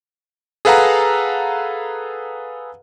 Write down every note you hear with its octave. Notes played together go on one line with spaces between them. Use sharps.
G#4 A4 B4 F5 F#5 A#5